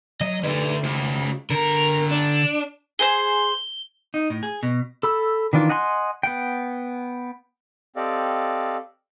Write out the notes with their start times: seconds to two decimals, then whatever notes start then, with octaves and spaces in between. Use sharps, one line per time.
0.21 F#3 C#5 D#5
0.44 D2 D3 B4 D5
0.84 C#2 F#4 C5
1.50 D3 A#4 A#5
2.11 D4
2.99 G#4 B4 C5 G7
4.14 D#4
4.30 A2
4.43 G#4
4.63 B2
5.03 A4 B5 E6
5.53 D#3 E3 D4 F4
5.69 D#5 F#5 G#5 B5 C6
6.23 B3 F#5 G5
7.96 C4 G4 A4 D5 D#5 F5